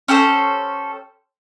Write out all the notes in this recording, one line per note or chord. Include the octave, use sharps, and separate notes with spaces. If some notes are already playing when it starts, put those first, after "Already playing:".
C#4 G4 A4 C5